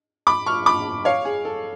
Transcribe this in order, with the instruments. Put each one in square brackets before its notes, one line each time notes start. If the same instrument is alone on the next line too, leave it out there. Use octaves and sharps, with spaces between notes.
[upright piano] B5 D6
C#6 F6
B5 D6
C#5 F5
G#4
A4